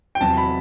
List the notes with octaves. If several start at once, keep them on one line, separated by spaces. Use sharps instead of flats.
G5
E2 C3 F#3 A5
B5